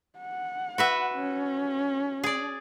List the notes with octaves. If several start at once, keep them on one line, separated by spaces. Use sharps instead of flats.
F#5
F#4 B4 E5
C#4
G#4 D5